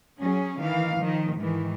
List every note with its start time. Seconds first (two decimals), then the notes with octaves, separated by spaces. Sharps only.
0.20 F#3 C#4 G#4
0.62 D#3 E3 F5
1.01 D#3 F3
1.37 G#2 D#3 E3